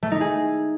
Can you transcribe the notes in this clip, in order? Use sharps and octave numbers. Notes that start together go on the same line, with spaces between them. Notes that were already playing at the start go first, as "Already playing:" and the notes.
A3
D#4
G#4